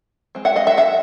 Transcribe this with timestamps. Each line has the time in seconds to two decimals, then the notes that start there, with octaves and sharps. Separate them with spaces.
0.35 G#3 C4
0.45 E5 F#5
0.56 D#5 F5
0.67 E5 F#5
0.78 E5 F#5